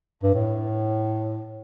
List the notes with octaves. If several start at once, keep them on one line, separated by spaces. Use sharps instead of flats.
G2
A2